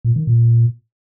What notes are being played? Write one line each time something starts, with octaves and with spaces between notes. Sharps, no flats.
A#2
D#3
A#2